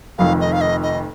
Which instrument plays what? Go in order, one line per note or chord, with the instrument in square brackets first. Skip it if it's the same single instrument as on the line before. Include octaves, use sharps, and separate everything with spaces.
[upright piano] F1 F2 D#3 [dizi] F5
[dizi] D#5
F5
D#5
D#5